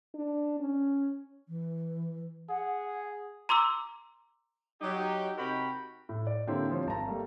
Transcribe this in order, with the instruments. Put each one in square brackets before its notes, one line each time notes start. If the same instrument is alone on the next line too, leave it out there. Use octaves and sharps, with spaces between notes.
[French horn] D4
C#4
[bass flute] E3
[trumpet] G#4 [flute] F#5
[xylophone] A#5 C6 D6 E6
[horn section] F#3 D#4 G4
C3 D#4 F#4 A#4 G5 B5
[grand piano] A2
D5
D3 A#3 C4 E4 G4 C#5
F3 G3 C4 C#5
G#1 A5 A#5
G3 A3 A#3